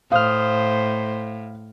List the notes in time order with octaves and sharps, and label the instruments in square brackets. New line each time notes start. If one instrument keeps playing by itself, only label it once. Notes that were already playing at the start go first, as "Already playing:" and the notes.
[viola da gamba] A2 [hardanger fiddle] C5 [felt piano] F5 [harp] D#6 F6